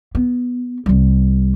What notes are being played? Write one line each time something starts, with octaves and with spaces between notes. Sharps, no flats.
B3
C2 G3